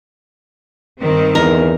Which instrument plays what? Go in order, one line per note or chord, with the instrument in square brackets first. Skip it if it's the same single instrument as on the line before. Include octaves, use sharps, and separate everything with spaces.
[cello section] G2 D#3 C4
[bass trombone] E2 [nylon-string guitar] A#4